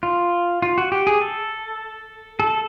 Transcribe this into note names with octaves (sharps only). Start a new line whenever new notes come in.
F4
F4
F#4
G4
G#4
A4
A4